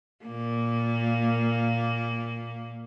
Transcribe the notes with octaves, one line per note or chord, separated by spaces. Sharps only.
A#2 A#3